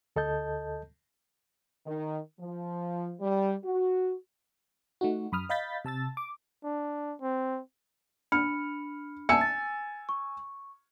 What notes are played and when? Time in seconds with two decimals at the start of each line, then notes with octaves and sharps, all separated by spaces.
0.16 D2 A4 D#5 A5 G6
1.86 D#3
2.40 F3
3.20 G3
3.64 F#4
5.01 A3 D#4 F#4
5.32 F#2 B5 D#6 F6
5.49 D#5 F5 B5 G6 A6 B6
5.84 C3 A5 E6 A6
6.17 D6
6.64 D4
7.21 C4
8.32 D4 B5 F6 C#7
9.29 E5 G#5 A5 E6 C#7
9.41 A6
10.09 C#6